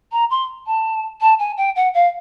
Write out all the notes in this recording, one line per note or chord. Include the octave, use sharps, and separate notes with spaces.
A#5
C6
A5
A5
G#5
G5
F#5
F5